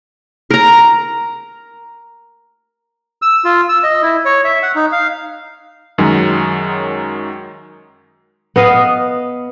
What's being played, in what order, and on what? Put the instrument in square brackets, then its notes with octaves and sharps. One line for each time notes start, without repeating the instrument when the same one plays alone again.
[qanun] A#4 A#5
[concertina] E6
F4
E6
D#5
E4
C#5
E5
F#5
D#4
F5
[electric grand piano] F#2 D#3 F#3 G#3
[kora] B3 D#5 F5